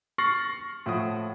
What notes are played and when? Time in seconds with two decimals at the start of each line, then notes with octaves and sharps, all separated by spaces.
0.18 C#6 F6 A6 A#6 C7 F#7
0.86 A2 F3 F#5 D#6